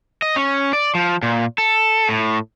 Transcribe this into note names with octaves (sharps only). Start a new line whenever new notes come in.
D#5
C#4
D5
F3
A#2
A4
A2